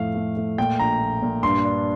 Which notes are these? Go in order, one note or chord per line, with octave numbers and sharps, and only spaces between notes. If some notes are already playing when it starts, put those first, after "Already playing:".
Already playing: F2 A2 A3 F5
A3
A3
A#2 G5
A#1 A#5
A#1
A#2
G2 C6
D4